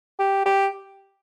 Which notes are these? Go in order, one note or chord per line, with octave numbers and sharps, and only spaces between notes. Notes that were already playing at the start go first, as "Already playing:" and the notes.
G4
G4